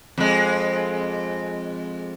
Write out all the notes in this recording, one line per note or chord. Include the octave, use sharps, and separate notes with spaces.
F2 G#3